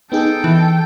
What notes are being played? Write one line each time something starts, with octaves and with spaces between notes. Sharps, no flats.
B3 D#4 G#4 A4 G5
E3